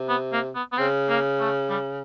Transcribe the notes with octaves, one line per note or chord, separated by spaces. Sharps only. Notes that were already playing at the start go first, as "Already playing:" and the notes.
Already playing: C3
B3
A#3
B3
B3
C#3 C4
A#3
A3
G3